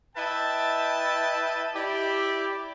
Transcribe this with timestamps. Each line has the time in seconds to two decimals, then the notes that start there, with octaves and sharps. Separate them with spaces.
0.16 E4 B4 D#5 E5 G5 A5
1.75 E4 G4 D5